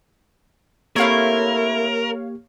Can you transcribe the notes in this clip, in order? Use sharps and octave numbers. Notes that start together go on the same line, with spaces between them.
A3 A#3 C4 E4 G4 A#4 C#5 F5